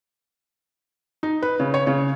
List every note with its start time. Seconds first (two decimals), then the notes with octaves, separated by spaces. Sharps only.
1.23 D#4
1.42 B4
1.60 C#3
1.74 C#5
1.87 C#3